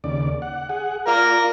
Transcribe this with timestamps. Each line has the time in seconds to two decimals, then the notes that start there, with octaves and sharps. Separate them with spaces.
0.04 D#2 C#3 D5
0.42 F#5
0.69 G#4 F#5
1.07 F4 A#4 D5 F5